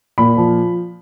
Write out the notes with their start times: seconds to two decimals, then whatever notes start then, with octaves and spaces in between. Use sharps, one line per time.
0.18 A#2 B5
0.37 F3